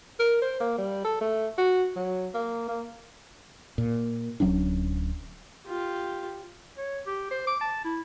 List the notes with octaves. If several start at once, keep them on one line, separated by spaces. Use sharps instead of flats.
A#4
C5
A#3
G3
A4
A3
F#4
F#3
A#3
A#3
A#2
D1 F#3 C#4 D4
F4 G4
C#5
G4
C5
D6
A5
E4